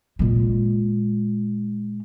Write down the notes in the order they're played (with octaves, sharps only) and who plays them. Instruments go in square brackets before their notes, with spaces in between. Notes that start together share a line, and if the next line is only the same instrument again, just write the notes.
[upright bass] A#2 G#3